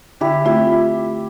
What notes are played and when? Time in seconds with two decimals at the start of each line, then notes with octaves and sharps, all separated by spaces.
0.21 D3 E4 G4
0.45 A3 C4 E4 F4 G4